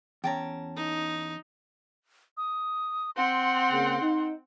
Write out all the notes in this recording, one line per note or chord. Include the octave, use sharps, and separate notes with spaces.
E2 C#4 G5 A5 A#5
D#4
D#6
C4 F#5 C6
C#3 A#3 G#4
D#4